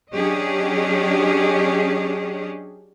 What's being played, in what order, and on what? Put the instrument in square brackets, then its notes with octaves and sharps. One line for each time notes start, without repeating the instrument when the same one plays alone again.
[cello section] F#3 C#4 D4 G4 G#4 D#5